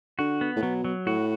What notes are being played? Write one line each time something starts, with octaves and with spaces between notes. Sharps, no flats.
D3 F#4
B3
A2
B2 F#3
F#3
A2 F#4